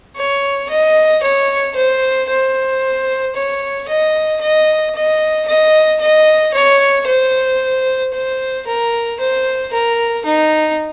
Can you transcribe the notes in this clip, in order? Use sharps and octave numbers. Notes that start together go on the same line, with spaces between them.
C#5
D#5
C#5
C5
C5
C#5
D#5
D#5
D#5
D#5
D#5
C#5
C5
C5
A#4
C5
A#4
D#4